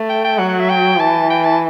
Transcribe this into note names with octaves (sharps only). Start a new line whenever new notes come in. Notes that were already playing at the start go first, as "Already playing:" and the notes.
Already playing: A3
G5
G5
F#3 F#5
F#5
E5
G5
E3 A5
G5
A5